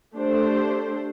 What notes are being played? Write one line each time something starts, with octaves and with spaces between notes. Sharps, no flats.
A3 D4 G4 C5